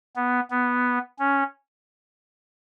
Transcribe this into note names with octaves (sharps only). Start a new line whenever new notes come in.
B3
B3
C#4